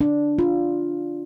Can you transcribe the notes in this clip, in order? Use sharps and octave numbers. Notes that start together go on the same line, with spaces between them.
D4
F4